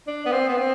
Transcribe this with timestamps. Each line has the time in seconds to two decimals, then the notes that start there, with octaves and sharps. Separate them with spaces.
0.08 D4
0.26 B3
0.32 C4
0.49 B3
0.58 C4